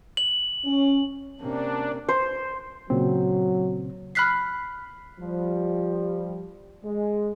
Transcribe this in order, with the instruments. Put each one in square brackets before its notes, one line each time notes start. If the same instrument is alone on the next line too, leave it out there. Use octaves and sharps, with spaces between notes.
[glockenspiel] F#7
[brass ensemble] C#4
[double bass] C3 C#4 [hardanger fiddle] A#3 [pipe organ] D4
[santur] C5
[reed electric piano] A#2 C#3 C4 [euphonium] F#3
[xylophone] B5 F6 F#6 B6 C7
[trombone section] F3 G3
G#3